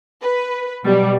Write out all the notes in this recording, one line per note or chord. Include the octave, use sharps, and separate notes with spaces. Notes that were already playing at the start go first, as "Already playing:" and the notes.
B4
B2 F#3 G3